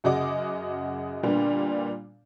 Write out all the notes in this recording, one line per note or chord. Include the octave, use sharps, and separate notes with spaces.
F#2 C#3 F#4 G#4 D#5 D6
A#2 D3 G3 A#3 B3 D4